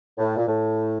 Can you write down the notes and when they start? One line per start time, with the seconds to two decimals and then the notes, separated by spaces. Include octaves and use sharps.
0.18 A2
0.37 A#2
0.47 A2